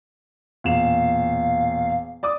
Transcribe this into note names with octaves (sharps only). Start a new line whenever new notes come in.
E1 A#2 F5 E7
D5 D6 D#6